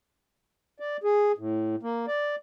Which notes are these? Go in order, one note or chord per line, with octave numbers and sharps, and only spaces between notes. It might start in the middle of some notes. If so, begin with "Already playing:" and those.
D5
G#4
A2
A#3
D5